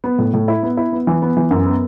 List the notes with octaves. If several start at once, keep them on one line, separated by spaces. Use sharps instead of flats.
B3
A2
A2
E4
B3
E4
B3
E3
B3
E3
F#2
B3